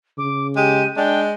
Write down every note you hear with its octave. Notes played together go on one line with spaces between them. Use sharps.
C#3 D6
G#3 G4 D#7
G#3 D4 G5